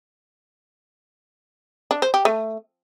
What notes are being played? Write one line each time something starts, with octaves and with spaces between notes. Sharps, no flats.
D4
C5
G4
A3